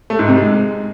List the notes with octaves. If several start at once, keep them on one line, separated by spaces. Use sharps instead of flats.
A3
G#2
C3
G#3